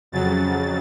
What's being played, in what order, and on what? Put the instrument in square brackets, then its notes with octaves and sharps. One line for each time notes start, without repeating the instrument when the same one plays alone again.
[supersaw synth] F2 C#3 F#3 A6